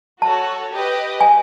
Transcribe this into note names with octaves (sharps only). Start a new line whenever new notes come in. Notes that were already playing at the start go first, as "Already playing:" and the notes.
F#4 A4 C#5 A5
G4 B4 D#5
G#5